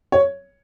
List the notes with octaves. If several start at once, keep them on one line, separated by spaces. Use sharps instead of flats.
C#5